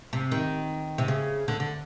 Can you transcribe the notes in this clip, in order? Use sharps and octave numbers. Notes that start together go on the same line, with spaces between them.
C3
D#3
C3
C#3
D3
D3